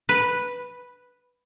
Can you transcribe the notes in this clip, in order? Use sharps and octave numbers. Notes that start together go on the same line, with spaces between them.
B4